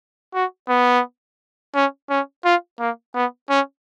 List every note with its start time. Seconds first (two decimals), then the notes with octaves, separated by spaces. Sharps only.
0.34 F#4
0.69 B3
1.75 C#4
2.09 C#4
2.45 F4
2.79 A#3
3.15 B3
3.50 C#4